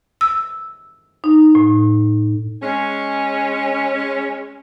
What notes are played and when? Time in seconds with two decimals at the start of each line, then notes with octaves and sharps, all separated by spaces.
0.21 E6
1.24 D#4
1.55 A2
2.62 G#3 C#4